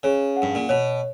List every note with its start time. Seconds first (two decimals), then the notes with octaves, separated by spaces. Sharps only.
0.03 C#3 C#5
0.36 F#5
0.42 G2
0.55 A#2
0.69 B2 C#5